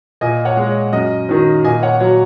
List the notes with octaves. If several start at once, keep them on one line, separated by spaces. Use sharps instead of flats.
A#2 D#5 G#5
C#5 F#5
G#3
C#5
F#2 D#5
D#3 F#3
A#2 D#5 G#5
C#5 F#5
F#3 C#5